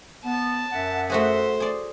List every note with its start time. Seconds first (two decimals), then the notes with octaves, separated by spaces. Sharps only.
0.25 B3 A5
0.72 F#2 E5 F#5
1.10 A3 F#4 G#4 C5
1.60 G#4 D5